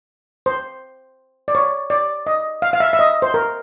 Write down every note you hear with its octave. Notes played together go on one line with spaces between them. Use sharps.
C5
D5
C#5
D5
D#5
F5
F5
E5
E5
D#5
C5
A#4